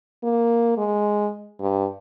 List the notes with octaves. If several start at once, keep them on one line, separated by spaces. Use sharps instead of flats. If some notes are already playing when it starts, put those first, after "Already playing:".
A#3
G#3
G2